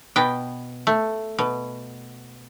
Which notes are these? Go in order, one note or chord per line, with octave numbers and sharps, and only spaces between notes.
B2 B3 G5
A3
B2